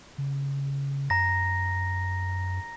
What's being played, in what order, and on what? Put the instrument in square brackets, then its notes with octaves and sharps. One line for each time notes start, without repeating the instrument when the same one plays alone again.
[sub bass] C#3
[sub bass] F#2 [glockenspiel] A#5 A#6